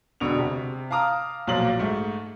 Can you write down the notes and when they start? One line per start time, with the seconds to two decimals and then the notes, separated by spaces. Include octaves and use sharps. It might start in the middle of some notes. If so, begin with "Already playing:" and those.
0.20 E1 B2 D3 F7
0.39 C3
0.91 F5 A5 A#5 D6 D#6 F6
1.47 B1 A#2 F3 F#3 F5 F#7
1.79 G#2 A3